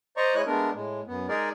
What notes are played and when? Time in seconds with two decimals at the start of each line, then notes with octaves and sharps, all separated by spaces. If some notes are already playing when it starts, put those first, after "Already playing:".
0.17 C5 D5 D#5 A#5 C#6
0.35 G#3 E4 C#5 D#5 F#6
0.46 G#3 A3 B3 D4 A#4
0.74 A2 G#3
1.07 F#2 B3
1.29 G#3 D#4 G#4 A#4 D5